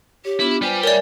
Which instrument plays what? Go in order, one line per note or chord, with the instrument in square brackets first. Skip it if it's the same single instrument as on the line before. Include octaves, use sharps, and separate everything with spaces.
[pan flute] G4 [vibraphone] C#5
[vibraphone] B3 D4 F4 [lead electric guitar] E4
[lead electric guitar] G3 G4 [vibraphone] F4 B4 C5 [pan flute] G#5
[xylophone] A#4 D5 [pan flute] C#5 [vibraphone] E5 G#5